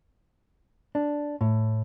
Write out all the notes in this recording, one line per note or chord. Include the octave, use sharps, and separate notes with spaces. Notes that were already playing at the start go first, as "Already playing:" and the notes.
D4
A2